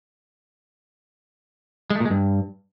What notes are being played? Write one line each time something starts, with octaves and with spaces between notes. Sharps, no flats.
G#3
A3
A#2
G#3
G2